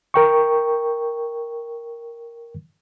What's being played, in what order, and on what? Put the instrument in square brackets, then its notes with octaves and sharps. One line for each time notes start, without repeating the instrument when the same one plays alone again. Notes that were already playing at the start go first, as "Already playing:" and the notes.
[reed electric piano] A#4 G5 C#6